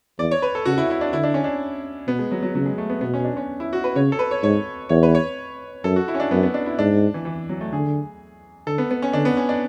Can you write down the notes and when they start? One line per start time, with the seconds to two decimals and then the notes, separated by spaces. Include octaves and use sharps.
0.19 E2 D5
0.31 C#5
0.42 B4
0.55 A4
0.66 C#3 F#4
0.78 E4
0.90 E4
1.01 D4
1.13 D3 E4
1.24 D4
1.34 C#4
1.44 D4
2.07 B2 B3
2.19 G#3
2.32 F#3
2.43 F#3
2.55 C#3 F#3
2.66 G#3
2.78 A3
2.90 B3
3.01 B2 B3
3.14 C#4
3.25 D4
3.37 C#4
3.60 E4
3.73 F#4
3.84 B4
3.96 C#3 C#5
4.12 A4
4.19 B4
4.31 C#5
4.43 G#2 C#5
4.89 E2 C#5
5.03 B4
5.15 C#5
5.84 F#2 A4
5.96 F#4
6.08 E4
6.14 C#4
6.20 D4
6.31 F#2 B3
6.43 B3
6.54 D4
6.66 E4
6.78 G#2 D4
7.14 E3
7.25 E3
7.49 F#3
7.61 A3
7.72 D3 G#4
8.67 D3 A4
8.78 B3
8.91 B3
9.02 C#4
9.13 D3 D4
9.25 B3
9.37 C#4
9.49 D4